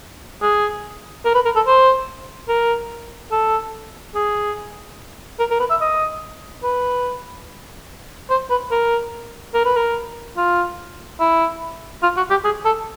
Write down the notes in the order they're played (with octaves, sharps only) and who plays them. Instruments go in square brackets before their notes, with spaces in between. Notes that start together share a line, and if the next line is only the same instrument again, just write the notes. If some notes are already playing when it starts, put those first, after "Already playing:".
[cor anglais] G#4
A#4
B4
A#4
A4
C5
A#4
A4
G#4
A#4
A#4
B4
E5
D#5
B4
C5
B4
A#4
A#4
B4
A#4
F4
E4
F4
F#4
G4
G#4
A4